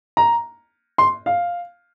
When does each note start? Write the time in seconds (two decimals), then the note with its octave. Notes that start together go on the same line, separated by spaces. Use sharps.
0.17 A#5
0.98 C6
1.26 F5